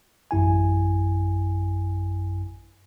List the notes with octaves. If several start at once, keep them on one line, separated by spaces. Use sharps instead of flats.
A1 F#2 E4 G#5